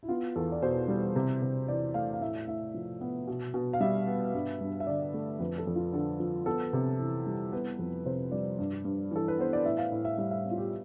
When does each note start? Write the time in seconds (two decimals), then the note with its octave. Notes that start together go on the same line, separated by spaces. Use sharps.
0.03 E4
0.08 B3 F4
0.36 E2 A4
0.52 D5
0.62 B2 C5
0.88 G3
1.16 C3
1.42 C3
1.68 E3 D5
1.94 A3 F5
2.13 F5
2.21 A2 E5
2.47 A2 E5
2.74 F3
3.01 B3
3.27 B2
3.54 B2
3.73 F5
3.80 G3 E5
4.07 B3
4.34 G2
4.61 G2
4.80 E5
4.87 D3 D5
5.14 A3
5.40 F2 B4
5.58 A4
5.67 F2
5.75 F4
5.93 D3 A4
6.20 F3
6.46 B3 A4
6.73 C3
7.00 E3
7.26 G3
7.52 B3 B4
7.79 F2
8.06 C3 C5
8.32 G3 D5
8.59 G2
8.85 G2
9.11 E3 A4
9.28 B4
9.39 B3 C5
9.53 D5
9.65 A2 E5
9.78 F5
9.92 A2
10.05 E5
10.18 G3 E5
10.31 E5
10.45 B3
10.51 F4
10.58 G4